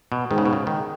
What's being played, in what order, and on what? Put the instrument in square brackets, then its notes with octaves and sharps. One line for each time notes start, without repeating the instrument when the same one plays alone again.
[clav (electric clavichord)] B2
[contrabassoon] G#2 [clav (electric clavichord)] D#3
[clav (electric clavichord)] C#3
B2
C#3
D#3